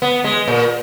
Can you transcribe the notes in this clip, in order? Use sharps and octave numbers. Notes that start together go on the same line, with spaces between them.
B3
G#3
A#2